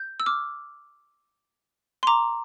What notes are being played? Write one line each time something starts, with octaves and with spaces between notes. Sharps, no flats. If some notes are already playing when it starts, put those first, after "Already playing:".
Already playing: G6
E6
D6 F6
C6
A#5 D6